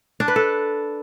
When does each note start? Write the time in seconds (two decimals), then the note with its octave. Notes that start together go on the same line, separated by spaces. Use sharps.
0.20 D4
0.28 B4
0.36 A4